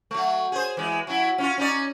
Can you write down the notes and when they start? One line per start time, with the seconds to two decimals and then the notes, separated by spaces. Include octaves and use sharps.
0.11 F#3 A3
0.52 G#4 C5
0.77 E3 G#3
1.07 F#3 E4
1.38 C#4 E4 F4
1.58 C#4 D#4 D5